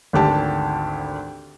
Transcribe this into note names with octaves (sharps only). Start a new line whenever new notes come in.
G#1 D2 G4 A5